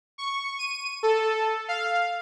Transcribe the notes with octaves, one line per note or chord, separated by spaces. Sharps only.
C#6
D#7
A4
F5